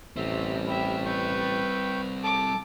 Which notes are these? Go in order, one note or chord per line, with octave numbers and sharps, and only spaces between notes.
A1 G3 C4 E5
E4 G4 E5
B4 G5 C#6
A4 A5 D6